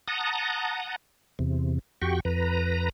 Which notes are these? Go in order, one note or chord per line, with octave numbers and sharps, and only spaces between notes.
F#5 A5 A#5 D#6
E2 C3
F2 F#4 G4 G5 C#6
F2 B4 A#5